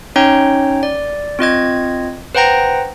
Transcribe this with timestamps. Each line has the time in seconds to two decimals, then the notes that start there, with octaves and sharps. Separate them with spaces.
0.16 C#4 D#4 C#5 G5 A#5
0.83 D5
1.39 C4 F4 D#5 G#6
2.35 B4 C5 F#5 G5 A#5 A#6